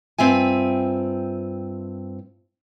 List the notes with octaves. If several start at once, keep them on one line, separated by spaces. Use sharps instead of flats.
G2 C4 F4 E5 G#5